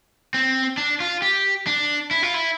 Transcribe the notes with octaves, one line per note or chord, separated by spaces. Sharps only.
C4
D4
F4
G4
D4
E4
F4
E4